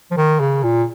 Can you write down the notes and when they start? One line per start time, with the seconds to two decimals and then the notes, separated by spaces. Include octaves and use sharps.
0.11 F3
0.17 D#3
0.40 C#3
0.64 A#2